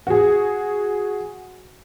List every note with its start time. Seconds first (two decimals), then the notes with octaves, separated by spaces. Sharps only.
0.07 F#4 G#4